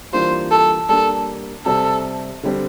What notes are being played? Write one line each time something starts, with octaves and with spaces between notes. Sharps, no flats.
E3 G3 A#3 D4 F4 C5
A4
G3 A#3 D4 A4
C3 G3 C4 A4
D3 G3 C4